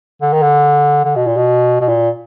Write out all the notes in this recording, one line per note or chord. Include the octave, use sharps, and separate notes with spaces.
D3
D#3
D3
D3
B2
A#2
B2
B2
A#2